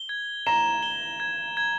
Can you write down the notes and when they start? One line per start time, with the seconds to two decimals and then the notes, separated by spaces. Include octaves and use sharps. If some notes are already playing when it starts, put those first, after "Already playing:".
Already playing: G7
0.09 G#6
0.46 A#5 E7
0.83 G7
1.20 G#6
1.57 G#6